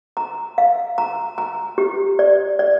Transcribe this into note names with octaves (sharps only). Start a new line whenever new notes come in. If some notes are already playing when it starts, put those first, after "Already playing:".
A#5
F5
A#5
A#5
G4
D5
D5